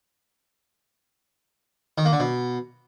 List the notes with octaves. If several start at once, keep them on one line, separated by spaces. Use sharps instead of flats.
D#3
A#3
D3
B2